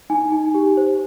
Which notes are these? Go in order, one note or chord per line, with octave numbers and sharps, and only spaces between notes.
D#4 G#5
D#4
G4
C5